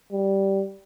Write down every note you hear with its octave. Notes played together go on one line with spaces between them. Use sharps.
G3